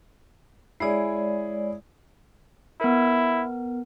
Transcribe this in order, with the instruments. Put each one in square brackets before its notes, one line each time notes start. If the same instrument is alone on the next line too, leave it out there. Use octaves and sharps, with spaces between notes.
[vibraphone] G#3 C#5 D5 [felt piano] E4 G#4
[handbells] B3 A#4 [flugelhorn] E4